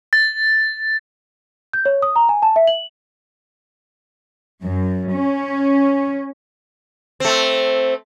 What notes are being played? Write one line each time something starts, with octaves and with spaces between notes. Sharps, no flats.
A6
G6
C#5
D#6
A#5
G#5
A5
E5
F#7
F#2
C#4
A3 C4